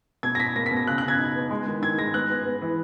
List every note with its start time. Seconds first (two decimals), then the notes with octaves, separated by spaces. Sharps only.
0.23 B2 G#6
0.35 A#6
0.39 B2 B6
0.56 A#3 A#6
0.66 B6
0.72 B2
0.77 A#6
0.87 C#3 F#6
0.98 F#6
1.02 C#3
1.08 G#6
1.19 D#4
1.35 B3
1.50 G#3
1.67 D#3
1.82 D#3 G#6
1.98 G#3 A#6
2.14 B3 F#6
2.29 B3
2.45 B3
2.62 E3